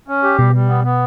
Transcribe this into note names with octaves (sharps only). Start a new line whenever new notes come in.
C#4
G4
B2 G3
G3
B3
B3